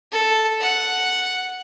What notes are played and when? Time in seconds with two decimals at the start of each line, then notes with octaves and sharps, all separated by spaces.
0.12 A4
0.61 F#5